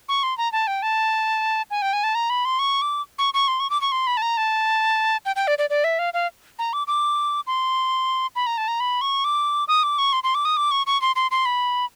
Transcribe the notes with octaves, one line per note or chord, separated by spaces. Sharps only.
C#6
C6
A#5
A5
G5
A5
G#5
G5
G#5
A5
A#5
B5
C6
C#6
D6
C#6
C#6
C6
C#6
D6
C#6
C6
B5
A5
A#5
A5
G5
G5
D5
D5
D5
E5
F5
F5
A#5
D6
D6
C6
B5
A#5
A5
A#5
B5
C#6
D6
D#6
D6
C#6
C6
C6
D6
D#6
D6
C#6
C#6
C6
C6
C6
B5